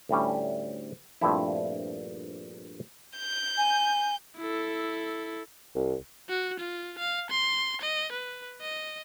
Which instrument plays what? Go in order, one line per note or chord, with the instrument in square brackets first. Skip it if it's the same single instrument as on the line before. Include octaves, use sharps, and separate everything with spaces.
[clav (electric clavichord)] D2 A2 G3 C#4
A#1 G2 F3 A3 C4 E4
[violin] G6
[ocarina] G#5
[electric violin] E4 A4
[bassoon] C2
[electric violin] F#4
F4
F5
C6
D#5
B4
D#5